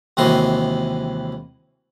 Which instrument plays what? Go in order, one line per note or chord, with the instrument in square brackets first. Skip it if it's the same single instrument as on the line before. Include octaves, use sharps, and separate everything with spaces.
[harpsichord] D#2 C3 E3 G#3 F#4 C6